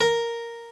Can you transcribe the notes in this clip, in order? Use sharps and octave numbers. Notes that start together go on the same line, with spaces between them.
A#4